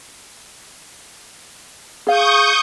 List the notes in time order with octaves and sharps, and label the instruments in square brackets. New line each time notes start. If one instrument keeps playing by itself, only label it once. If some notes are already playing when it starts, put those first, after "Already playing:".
[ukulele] G#4 F5 [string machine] C#6 D#6 G6